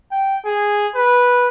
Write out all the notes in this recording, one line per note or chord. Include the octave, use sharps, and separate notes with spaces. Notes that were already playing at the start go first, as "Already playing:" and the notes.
G5
G#4
B4